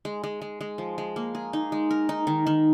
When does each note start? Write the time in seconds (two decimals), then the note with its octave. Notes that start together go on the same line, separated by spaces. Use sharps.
0.05 G#3
0.24 G#3
0.42 G#3
0.61 G#3
0.78 F3
0.98 G#3
1.16 A#3
1.35 G#4
1.53 D#4
1.72 G#3
1.91 A#4
2.09 D#4
2.27 D#3
2.47 D#3